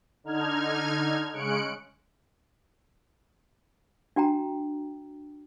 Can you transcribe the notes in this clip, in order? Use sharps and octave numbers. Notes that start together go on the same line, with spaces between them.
D3 D#4 F6 G#6
C#3 G#3 C#4 F#6 C#7 D7
D4 F#4 G5 A#5